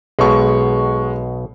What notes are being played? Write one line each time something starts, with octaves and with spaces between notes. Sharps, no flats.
B1 B2 G#3 C#6